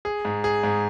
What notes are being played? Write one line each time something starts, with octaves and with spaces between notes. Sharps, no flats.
G#4
G#2
G#4
G#2